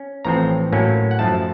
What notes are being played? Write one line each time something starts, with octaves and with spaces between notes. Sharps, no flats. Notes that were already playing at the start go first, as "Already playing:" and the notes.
Already playing: C#4
A1 A2 F3 C4 A#5
A2 F#3 A#3 C#4
F#5
F#2 F3 A3 A5